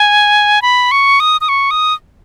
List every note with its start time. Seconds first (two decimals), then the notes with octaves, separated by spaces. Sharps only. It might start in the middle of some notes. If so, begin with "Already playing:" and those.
Already playing: G#5
0.62 B5
0.91 C#6
1.20 D#6
1.41 D#6
1.49 C#6
1.71 D#6